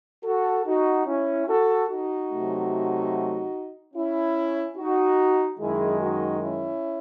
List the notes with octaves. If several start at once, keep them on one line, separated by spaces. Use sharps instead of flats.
F#4 A4
D#4 F#4
C#4 E4
F#4 A4
D#4 F#4
C3 F#3 A3
C#4 E4
D#4 F#4
F#2 D#3 G#3 E4 G#4
D#4 F#4
C#4 E4